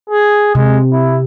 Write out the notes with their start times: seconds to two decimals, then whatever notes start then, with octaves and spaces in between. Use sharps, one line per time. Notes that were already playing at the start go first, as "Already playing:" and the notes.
0.10 G#4
0.55 C3 G#3
0.92 E4